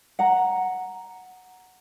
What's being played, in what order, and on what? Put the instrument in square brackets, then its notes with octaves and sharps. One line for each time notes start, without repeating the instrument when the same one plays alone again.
[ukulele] F#5 A#5